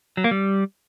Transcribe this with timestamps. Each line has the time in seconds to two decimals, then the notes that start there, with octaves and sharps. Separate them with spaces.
0.17 F#3
0.24 A#3
0.31 G3